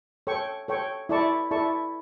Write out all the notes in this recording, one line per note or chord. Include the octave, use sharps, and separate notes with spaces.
A4 C#5 G5 C#6
A4 C#5 G5 C#6
E4 A4 D5 A5 C#6
E4 A4 D5 A5 C#6